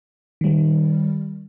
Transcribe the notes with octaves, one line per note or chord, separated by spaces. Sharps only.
D#3 G3